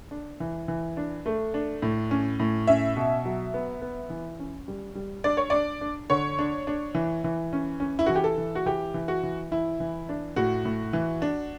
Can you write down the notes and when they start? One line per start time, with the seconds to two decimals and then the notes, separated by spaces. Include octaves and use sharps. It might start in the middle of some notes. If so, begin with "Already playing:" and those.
0.11 D4
0.40 E3
0.68 E3
0.97 D4
1.26 A3
1.54 D4
1.82 A2
2.11 C#4
2.40 A2
2.67 C#4 E5
2.96 B2
3.25 F#3
3.54 B3
3.82 B3
4.10 E3
4.39 C#4
4.68 G3
4.95 G3
5.24 D4 D5
5.37 C#5
5.50 D4 D5
5.81 D4
6.10 D3 C#5
6.39 D4
6.67 D4
6.95 E3
7.24 E3
7.53 C#4
7.80 C#4
7.99 E4
8.06 E3 F#4
8.16 G4
8.24 A4
8.38 E3
8.55 F#4
8.66 E3 G4
8.94 E3
9.08 F#4
9.23 E3
9.51 E3 E4
9.80 E3
10.09 D4
10.36 A2 F#4
10.65 A2
10.93 E3
11.22 D4